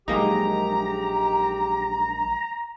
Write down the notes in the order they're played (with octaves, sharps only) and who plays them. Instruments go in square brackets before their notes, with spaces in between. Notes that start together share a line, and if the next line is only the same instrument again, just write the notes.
[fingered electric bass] A#1 F3 F#3 [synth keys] G#3 A#3 D#4 [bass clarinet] G4 [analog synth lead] A#5